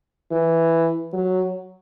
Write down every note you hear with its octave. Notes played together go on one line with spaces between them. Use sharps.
E3
F#3